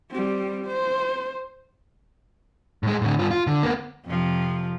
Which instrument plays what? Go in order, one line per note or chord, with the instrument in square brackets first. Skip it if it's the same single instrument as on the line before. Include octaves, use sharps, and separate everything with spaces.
[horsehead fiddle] G3 C4
C5
[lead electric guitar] A2 G#3
A2 D3
G2 F4
F4
D3
A#3 B3
[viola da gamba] F2 C3 F3